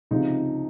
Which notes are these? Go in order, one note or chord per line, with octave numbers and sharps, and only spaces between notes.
C#2 C3 F3 D#4